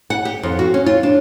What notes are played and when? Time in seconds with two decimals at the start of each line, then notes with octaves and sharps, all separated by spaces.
0.10 F#5
0.25 G4
0.43 F2
0.59 F#4
0.74 C#4
0.86 F4
1.03 D4